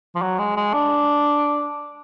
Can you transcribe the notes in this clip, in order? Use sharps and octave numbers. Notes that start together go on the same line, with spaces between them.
F3
F#3
G#3
G#3
D4